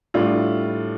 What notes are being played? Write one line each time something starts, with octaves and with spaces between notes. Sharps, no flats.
A2 G3 D4 F4